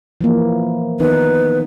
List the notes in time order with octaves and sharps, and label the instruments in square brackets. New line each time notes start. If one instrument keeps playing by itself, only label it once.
[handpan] E3 F3 A#3
[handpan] D#3 B3 D#4 [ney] B4